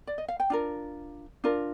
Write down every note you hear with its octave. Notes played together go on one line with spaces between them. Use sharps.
D5
D#5
F5
G5
D4 F4 A#4
D4 F4 A#4